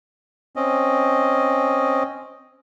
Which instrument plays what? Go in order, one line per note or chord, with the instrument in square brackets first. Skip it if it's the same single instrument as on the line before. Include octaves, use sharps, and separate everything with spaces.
[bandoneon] C4 C#4 D#5